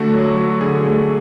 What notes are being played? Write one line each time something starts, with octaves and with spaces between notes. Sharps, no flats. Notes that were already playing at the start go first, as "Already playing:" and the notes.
Already playing: D3 A3 F#4
F#3
F#3
D3 G#4
A3